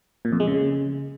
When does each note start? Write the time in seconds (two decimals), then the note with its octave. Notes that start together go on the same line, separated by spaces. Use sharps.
0.25 A#2
0.32 F2
0.40 G#3
0.47 C#3